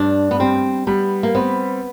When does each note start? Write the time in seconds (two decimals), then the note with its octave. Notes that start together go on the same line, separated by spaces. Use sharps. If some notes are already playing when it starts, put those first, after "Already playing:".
Already playing: G2 D4
0.31 B3
0.40 G3 C4
0.87 G3 B3
1.23 A#3
1.35 B3 C4